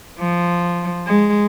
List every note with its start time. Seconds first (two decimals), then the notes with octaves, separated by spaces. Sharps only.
0.20 F3
1.07 G#3